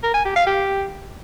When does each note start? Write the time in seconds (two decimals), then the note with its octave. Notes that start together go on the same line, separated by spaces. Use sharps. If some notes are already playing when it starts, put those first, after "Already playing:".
0.03 A#4
0.14 G#5
0.25 G4
0.36 F5
0.47 G4